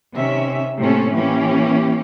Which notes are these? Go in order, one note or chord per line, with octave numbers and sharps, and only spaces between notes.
C3 D#3 C#4 E5
A2 C3 A#3 C#4 A4
E3 A#3 C#4 G4